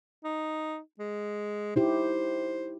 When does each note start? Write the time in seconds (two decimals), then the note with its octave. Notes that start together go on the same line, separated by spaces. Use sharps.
0.24 D#4
0.99 G#3
1.76 D#4 E4 G4 C5